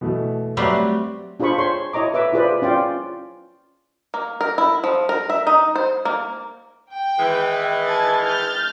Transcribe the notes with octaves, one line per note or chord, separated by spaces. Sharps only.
B2 E3 A3
F#3 G3 A3 C4 B4 D5
D4 F4 G#4 C5 B5 C#6
C5 C#5 C6 C#6
E4 C#5 D#5 A#5 D6
B4 E5 D6
E4 F4 G#4 B4 C5 D5
C#4 F4 D5 G5
A#3
A#4
E4
F3
A#4
E5
D#4
C5
A#3
G5
D#3 E3 G#3
A5 G#6 A6
F6 G6 A6